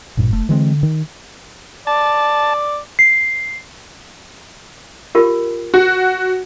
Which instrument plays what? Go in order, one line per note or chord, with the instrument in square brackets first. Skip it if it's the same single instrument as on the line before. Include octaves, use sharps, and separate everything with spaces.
[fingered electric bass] A1 G2 [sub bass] A#2
[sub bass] F1 [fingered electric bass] A3
[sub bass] D3 [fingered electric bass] E3 G#3 C4
[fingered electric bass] D#3
[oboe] D5 [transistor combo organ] A5
[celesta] C7
[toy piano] F4 G4 A#4
[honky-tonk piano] F#4